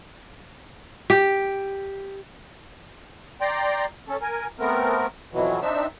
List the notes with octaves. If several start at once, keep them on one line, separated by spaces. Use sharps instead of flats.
G4
D5 G5 A#5 C6
C#4 A4
A#4 G#5
A3 B3 C4 A#4
F2 B2 E3 F#3
C4 D4 D#4 E5 E6